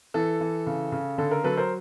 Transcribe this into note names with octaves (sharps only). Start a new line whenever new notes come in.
E3 A4
E3
C#3
C#3
D3 A4
A#4
F#3 A4 B4
A#4 C5